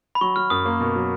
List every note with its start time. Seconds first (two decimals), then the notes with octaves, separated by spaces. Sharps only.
0.15 B5
0.21 F#3 C#6
0.36 F#3 F6
0.50 F#2 D#6
0.65 A#3
0.81 B2
0.96 F#3